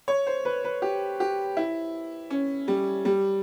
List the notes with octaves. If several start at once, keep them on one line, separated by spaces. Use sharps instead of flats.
C#5
C5
B4
B4
G4
G4
E4
C#4
G3
G3